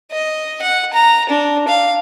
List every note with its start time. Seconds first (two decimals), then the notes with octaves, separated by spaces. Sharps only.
0.11 D#5
0.61 F#5
0.93 A#5
1.29 D4
1.68 F5